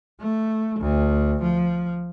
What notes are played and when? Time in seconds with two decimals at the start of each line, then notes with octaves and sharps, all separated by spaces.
0.21 A3
0.80 D2
1.42 F3